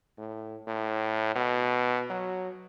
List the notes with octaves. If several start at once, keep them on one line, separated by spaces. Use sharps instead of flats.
A2
A2
B2
F#3